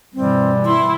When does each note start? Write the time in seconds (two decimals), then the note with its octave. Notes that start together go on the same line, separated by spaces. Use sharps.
0.14 G2 B2 E3 G3 C4
0.66 E4 C6